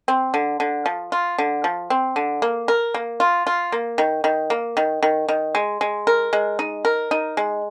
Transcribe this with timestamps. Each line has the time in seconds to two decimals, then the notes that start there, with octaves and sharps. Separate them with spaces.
0.08 C4
0.34 D3
0.60 D3
0.86 F3
1.12 F4
1.38 D3
1.64 F3
1.90 C4
2.16 D3
2.42 A#3
2.68 A#4
2.94 A#3
3.20 F4
3.47 F4
3.72 A#3
3.98 D#3
4.24 D#3
4.50 A#3
4.77 D#3
5.03 D#3
5.29 D#3
5.55 G#3
5.81 G#3
6.07 A#4
6.33 G#3
6.59 D#4
6.85 A#4
7.11 D#4
7.37 G#3